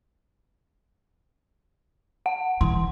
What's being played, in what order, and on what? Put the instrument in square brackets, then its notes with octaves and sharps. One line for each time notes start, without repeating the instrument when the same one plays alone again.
[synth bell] F#5
[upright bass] E3 [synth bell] C6